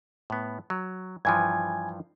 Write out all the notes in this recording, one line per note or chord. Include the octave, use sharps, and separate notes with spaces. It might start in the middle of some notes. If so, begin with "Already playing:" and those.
A2 B3
F#3
G2 E3 F3 G#5 G#6